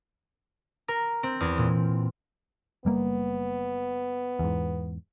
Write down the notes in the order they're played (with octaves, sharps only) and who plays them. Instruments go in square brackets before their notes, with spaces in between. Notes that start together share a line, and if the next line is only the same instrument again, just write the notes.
[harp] A#4
C4
E2
A#2
[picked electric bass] F#1 G3 A#3 [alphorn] B3
[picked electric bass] E2 G#2